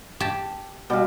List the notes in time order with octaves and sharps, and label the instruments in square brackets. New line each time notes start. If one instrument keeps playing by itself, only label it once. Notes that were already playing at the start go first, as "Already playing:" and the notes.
[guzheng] G4 A5
[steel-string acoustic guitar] B2 [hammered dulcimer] G3 F5